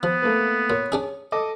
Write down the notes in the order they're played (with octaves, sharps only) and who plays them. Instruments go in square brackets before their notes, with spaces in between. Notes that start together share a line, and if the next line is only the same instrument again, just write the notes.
[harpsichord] F3 [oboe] B3
[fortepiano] A3 A#3 B4
[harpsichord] A#2 [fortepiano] C#5
[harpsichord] C#4 D4 G#4
[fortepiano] A4 D#5 D6